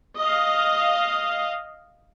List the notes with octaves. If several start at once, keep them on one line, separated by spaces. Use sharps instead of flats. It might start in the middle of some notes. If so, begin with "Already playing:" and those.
D#5 F5